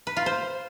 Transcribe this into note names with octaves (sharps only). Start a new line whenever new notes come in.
B4
F4
C5